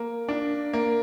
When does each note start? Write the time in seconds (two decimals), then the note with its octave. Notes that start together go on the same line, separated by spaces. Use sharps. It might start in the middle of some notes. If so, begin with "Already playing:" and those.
Already playing: A#3
0.29 D4
0.73 A#3